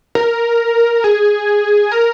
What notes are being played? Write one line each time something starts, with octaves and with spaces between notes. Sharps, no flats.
A#4
G#4
A#4